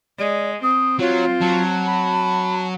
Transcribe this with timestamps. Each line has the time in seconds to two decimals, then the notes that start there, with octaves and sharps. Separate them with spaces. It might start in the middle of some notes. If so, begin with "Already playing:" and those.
0.18 G#3 D5
0.63 C4 D#6
0.99 F#3 F4 C#5
1.41 F#3 A5
1.86 B5